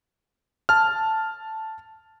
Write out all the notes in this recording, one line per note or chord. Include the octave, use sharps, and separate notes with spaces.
A5 F6